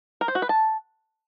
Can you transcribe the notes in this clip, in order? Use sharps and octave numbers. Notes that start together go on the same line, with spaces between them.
A#4
C5
F#4
B4
A5